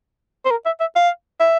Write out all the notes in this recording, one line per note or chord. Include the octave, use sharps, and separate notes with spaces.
C5
A#4
E5
E5
F5
E5